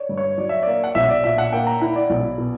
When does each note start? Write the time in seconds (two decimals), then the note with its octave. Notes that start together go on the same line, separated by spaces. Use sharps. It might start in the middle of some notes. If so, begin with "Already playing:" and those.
Already playing: C#5 D5
0.09 G2
0.17 C#5
0.38 F#3 D5
0.49 E5
0.63 A#3 D5
0.84 F#5
0.95 B1 E5
1.09 D5
1.24 A#2 E5
1.38 F#5
1.52 A#3 G5
1.67 A#5
1.81 E4 F#5
1.96 D5
2.10 B1
2.38 B2